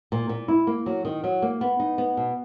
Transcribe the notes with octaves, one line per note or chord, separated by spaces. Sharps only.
A#2
A#2
E4
A#3
F#3
D#3
F#3
A#3
B3
D#4
B3
B2